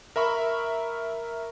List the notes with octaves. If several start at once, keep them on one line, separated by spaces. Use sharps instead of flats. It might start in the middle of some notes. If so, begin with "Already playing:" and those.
A#4 E5 B5 C#6